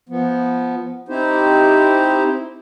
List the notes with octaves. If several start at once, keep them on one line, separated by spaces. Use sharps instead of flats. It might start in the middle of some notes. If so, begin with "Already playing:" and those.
F3 B3
C4 D#4 E4 G4 C5